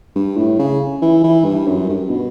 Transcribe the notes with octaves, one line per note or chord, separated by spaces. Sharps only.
G2
A2
C#3
E3
E3
G2
F#2
G2
B2